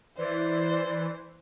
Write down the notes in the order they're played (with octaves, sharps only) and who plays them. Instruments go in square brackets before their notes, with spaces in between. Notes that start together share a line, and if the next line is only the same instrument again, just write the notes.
[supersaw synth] E3 [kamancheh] C5 [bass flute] D5